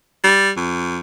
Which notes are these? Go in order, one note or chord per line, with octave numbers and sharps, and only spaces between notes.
G3
F2